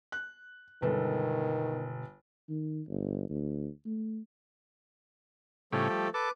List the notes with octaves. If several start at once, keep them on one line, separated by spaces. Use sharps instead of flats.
F#6
G1 B2 D#3 G3 G#3 A4 B4
D#3
G1
D2
A3
A2 C#3 F3 G3 A3 A4
G3
A4 B4 D6